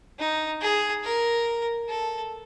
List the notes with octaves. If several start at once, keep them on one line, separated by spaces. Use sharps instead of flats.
D#4
G#4
A#4
A4